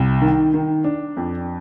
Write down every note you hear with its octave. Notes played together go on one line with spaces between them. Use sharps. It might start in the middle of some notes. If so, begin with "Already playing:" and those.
Already playing: C2
D#3
D#3
D4
F2